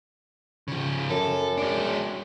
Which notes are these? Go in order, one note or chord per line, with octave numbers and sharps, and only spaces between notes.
C#3 F3
F#2 A4
G#3 D4